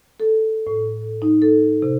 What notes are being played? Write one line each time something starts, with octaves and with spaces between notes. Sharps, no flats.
A4
A2
D#4
A4
C3